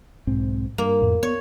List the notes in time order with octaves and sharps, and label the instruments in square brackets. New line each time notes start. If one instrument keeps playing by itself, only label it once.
[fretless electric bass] B1 G#2 C4
[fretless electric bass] G2 [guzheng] A#3
[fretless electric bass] F2 A2
[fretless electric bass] B3 [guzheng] C#5